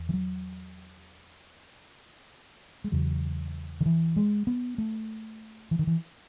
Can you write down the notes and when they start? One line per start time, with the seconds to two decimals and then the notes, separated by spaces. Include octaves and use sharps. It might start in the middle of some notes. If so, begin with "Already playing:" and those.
Already playing: E2
0.09 E3
0.14 F#3
2.84 G#3
2.92 E2 C#3 F#3
3.81 D#3
3.86 E3
4.16 G#3
4.47 B3
4.78 A3
5.71 E3
5.79 D#3
5.87 E3